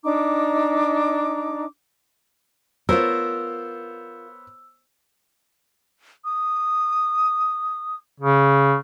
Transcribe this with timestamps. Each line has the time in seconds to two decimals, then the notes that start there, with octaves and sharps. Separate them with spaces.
0.05 D4 D#4 A#5 D6
2.89 B3 F4 A#4 C5 C#5 E6
6.25 D#6
8.20 C#3